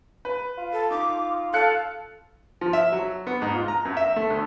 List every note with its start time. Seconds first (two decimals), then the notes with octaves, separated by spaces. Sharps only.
0.25 B4
0.58 F4
0.73 A4
0.91 D#4 D6
1.53 A4 F5 F#6 C#7
2.61 F3
2.73 E5
2.92 F#3
3.27 B3
3.42 G#2
3.54 F4
3.68 A#5
3.85 F#2
3.97 E5
4.16 A3
4.30 D2